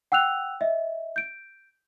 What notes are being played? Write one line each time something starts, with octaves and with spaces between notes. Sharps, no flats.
F#5 G5 E6 F#6 F7
D#5 E5
G6 D7